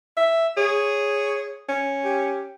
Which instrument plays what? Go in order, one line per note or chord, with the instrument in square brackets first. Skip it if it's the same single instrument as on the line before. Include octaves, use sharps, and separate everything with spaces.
[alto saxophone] E5
[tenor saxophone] G#4 [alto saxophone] C#5
[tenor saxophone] C#4
[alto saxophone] G4